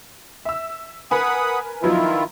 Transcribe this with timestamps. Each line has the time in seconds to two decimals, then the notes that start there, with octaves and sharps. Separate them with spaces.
0.45 E5 E6
1.11 A#4 B4 F#5 G#5 B5 D#6
1.83 D#3 F3 F#3 B3 E4 F4